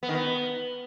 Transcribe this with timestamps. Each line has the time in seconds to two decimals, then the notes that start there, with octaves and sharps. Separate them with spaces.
0.03 B3
0.09 D#3
0.15 B3